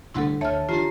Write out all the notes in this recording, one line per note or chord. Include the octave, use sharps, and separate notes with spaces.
C2 A2 D3 G3 D4 E4 A4 F#5
D2 D3 C#5 E5 A5 F6
D#3 F3 D4 F4 G4 A#5 C7